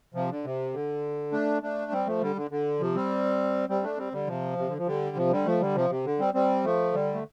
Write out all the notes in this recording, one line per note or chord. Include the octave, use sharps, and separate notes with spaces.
C3 F3
D3
C3
D3
A3 D4
A3 D4
G3 C4
F3 A3
D3 G3
D3
D3
C3 F3
G3 C4
G3 C4
A3 D4
G3 C4
D3 G3
C3 F3
C3
D3
F3
D3 G3
C3 F3
D3 G3
F3 A3
D3 G3
C3 F3
C3
D3
G3 C4
G3 C4
F3 A3
D3 G3
A3